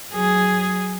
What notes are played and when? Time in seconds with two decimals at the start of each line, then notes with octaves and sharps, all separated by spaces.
0.12 F#3 G#4